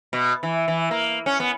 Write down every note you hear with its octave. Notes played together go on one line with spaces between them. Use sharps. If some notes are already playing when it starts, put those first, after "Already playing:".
B2
E3
E3
A#3
C#4
B3